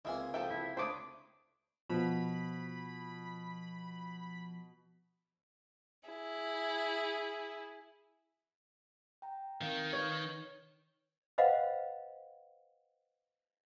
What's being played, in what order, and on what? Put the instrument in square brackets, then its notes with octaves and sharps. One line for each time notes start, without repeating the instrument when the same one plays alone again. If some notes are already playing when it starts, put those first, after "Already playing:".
[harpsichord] C#2 C3 A#3 [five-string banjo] E4 E5 G#5
[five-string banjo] F3 A4 E5 [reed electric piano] G5 G6
[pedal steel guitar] E4
[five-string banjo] A3 C#5 B5 [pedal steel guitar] D4 [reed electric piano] C5 D6 D#6
[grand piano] B2 [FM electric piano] F3 [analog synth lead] B5
[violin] E4 G#4
[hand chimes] G5 A#5
[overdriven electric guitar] D#3 [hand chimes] C4 F5
[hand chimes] B4 [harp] C#5
[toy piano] B4 C5 D#5 F5 F#5 B5